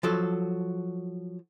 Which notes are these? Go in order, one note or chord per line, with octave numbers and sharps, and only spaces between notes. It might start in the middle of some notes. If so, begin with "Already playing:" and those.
F3 F#3 A4